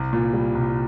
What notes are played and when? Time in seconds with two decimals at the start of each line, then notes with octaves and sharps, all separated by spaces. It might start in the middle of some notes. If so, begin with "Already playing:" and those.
Already playing: C2
0.13 A#2
0.33 G3
0.55 C2